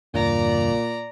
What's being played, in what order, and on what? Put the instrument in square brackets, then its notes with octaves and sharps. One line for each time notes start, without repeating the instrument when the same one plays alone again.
[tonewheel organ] E2 G2 D3 [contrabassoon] A#2 [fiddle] D5 A#5